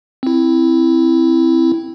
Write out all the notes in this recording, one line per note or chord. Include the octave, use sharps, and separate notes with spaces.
C4 E4